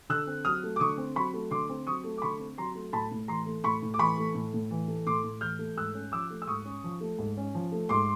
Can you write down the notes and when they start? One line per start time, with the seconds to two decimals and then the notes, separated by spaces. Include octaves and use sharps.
0.09 D3 E6 F#6
0.27 C4
0.45 F#3 D#6 F6
0.63 A3
0.76 D6
0.80 D3 C#6 D#6
0.98 C4
1.16 F#3 B5 C#6
1.33 A3
1.51 D3 C6 D6
1.69 C4
1.87 F#3 C#6 D#6
2.04 A3
2.18 D6
2.22 D3 B5 C#6
2.40 C4
2.58 F#3 A#5 C6
2.75 A3
2.93 A2 A5 B5
3.12 A2
3.28 E3 A#5 C6
3.46 A3
3.64 A2 B5 C#6
3.83 A2
3.94 D6
3.99 E3 B5 C#6
4.18 A3
4.35 A2
4.54 A2
4.71 E3
4.88 A3
5.06 A2 C6 D6
5.24 A2
5.41 E3 F6 G6
5.59 A3
5.76 G#2 E6 F#6
5.94 C#4
6.12 F3 D6 E6
6.30 A3
6.42 E6
6.47 G#2 C#6 D#6
6.65 C#4
6.84 F3
7.01 A3
7.19 G#2
7.37 C#4
7.55 F3
7.72 A3
7.89 G#2 C6 D6